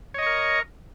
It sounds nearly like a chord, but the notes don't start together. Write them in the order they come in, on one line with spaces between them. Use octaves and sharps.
C#5 D#5 C#6 A#4